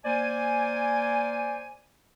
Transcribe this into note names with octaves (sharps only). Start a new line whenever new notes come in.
A#3 C5 D5 G#5